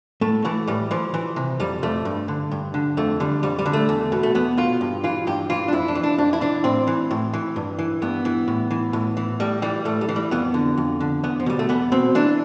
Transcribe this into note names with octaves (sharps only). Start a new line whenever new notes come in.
A2 A3
E3 A3
A2 G3
E3 F3
E3
C3
F2 G3
F2 A3
G2
D3
G2
D3
F2 A3
D3 G3
F2 G3
G3
D3
A3
E2
B2
A3
E2 B3
B2 F4
G2
E3 F4
G2 G4
E3 F4
D4
F2 E4
D4
E3
D4
F2 D4
E4
E3 D4
A2 C4
E3
A2
E3
G2
E3
G2 B3
E3
A2
E3
A2
E3
A2 G3
E3 G3
A2 A3
G3
E3
G3
F2 B3
D3
F2
D3
E2 B3
F3
B2 G3
A3
E2 B3
B2 C4
E3 D4